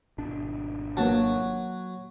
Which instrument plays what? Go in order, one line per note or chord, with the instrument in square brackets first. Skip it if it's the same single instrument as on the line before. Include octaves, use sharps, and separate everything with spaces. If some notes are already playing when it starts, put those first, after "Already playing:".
[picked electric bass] G#1 B2 D4
[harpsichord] F#3 [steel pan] A#3 B3 A5